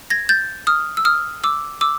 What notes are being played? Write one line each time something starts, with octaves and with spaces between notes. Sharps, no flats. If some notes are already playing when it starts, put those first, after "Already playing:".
G#6 A#6
G6 A6
D#6 F6
E6
D#6 F6
D6 E6
D6 E6